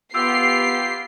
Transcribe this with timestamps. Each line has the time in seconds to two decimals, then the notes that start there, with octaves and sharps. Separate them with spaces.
0.15 B3 F4 G4 E6 C7